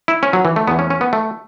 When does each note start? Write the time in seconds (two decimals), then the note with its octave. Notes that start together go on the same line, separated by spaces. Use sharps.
0.08 E4
0.23 C#4
0.33 F#3
0.45 E3
0.56 A3
0.67 E2 E3 B3
0.79 C#4
0.90 C#4
1.01 B3
1.13 A3